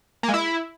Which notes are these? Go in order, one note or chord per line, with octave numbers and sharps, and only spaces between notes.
A#3
G#3
E4